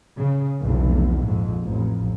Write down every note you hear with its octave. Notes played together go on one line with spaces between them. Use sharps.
C#3
F1 B1 E2
A#1 F2 G#2
A1 F2